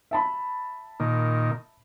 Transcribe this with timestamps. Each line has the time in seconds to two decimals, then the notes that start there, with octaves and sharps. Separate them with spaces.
0.11 E5 A5 B5
1.00 A#2 D#3